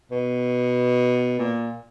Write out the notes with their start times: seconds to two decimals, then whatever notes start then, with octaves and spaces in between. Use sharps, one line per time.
0.11 B2
1.39 A#2